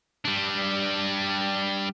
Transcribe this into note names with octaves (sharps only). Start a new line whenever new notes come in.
G3 D4